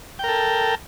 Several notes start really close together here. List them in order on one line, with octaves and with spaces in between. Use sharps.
G5 A#4 A4